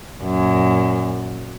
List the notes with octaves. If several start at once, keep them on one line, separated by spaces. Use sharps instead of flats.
F#2 A#2